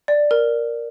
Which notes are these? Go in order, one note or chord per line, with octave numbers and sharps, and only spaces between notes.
D5
A#4